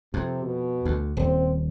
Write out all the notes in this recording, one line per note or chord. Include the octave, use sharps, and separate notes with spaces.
F2 C3
B2
D2
D#1 C4